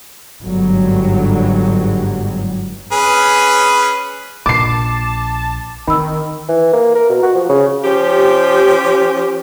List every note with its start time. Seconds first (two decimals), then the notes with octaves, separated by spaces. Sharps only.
0.42 G1 G#2 F#3 G3
2.92 C#4 G#4 B4
4.46 A#1 A5 D6 C7
5.87 D#3 C4 B5 E6
6.49 E3
6.73 A#3
6.95 A#4
7.10 B2
7.23 F#4
7.35 F3
7.49 C#3
7.84 F3 C#4 G4